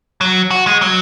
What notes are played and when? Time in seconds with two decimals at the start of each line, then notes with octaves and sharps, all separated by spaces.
0.21 F#3
0.51 F#4
0.67 G#3
0.82 F#3